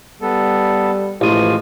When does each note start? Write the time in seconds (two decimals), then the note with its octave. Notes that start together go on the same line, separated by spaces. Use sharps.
0.22 G3 B3 A4
1.21 A1 E3 F3 G#3 F4 D#6